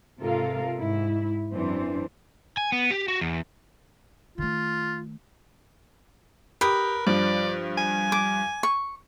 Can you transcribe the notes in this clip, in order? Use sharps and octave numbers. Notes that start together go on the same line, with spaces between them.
G#2 C3 F4 A4 A#4 F5
G#2 E4
F#2 E3 C4 D4 C5
G#5
B3
G4
F#4
E2
D#3 A3 F4
G4 A#4 B4 D#6
G2 F3 D5
G#5
D6
C#6